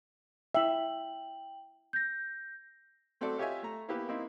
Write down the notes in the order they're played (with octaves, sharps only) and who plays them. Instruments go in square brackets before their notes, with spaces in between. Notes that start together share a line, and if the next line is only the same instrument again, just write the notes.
[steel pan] E4 E5 [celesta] G5 F#7
[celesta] G6 A#6
[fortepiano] A3 C4 F#4 A4 D5
F4 G4 C#5 D#5 E5 G#5
A3 A#5
E3 A#3 B3 E4 G4 B4
A#3 C4 D#4 E4